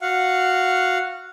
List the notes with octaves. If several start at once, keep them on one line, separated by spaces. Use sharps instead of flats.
F#4 F5 F#5